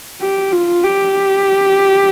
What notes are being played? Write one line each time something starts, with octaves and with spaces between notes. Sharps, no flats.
G4
F4
G4